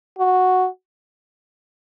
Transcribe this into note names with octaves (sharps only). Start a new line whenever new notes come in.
F#4